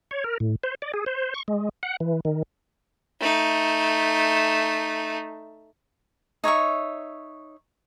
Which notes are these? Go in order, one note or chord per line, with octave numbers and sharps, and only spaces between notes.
C#5
A#4
A2
C5
D5
G#4
C5
C#6
G#3
F#5
E3
D#3
A3 D#4
D#4 C#5 E5 C#6